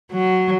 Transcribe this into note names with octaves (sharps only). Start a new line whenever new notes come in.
F#3